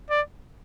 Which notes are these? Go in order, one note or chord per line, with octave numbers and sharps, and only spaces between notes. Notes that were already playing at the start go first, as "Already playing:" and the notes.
D5